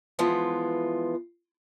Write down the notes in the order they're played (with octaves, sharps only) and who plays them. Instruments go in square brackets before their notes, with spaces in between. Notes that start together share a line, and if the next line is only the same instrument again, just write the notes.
[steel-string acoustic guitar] E3 F3 G#3 B3 F4